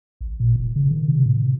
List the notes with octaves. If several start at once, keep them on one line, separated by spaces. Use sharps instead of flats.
A1
A#2
D#1
C#3
D#3
C3
A2